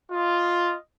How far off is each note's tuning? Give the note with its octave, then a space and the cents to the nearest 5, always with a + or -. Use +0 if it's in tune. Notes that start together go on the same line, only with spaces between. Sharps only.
F4 +0 D#5 +0